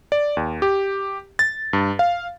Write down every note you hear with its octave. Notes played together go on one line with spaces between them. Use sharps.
D5
D#2
G4
A6
G2
F5